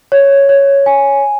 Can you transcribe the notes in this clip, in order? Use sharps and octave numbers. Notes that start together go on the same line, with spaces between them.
C#5
C#5
G#5